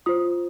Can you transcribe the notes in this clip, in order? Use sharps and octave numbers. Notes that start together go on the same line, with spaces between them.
F4 C5 D#6